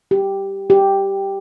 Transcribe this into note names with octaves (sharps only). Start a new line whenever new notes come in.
G4
G4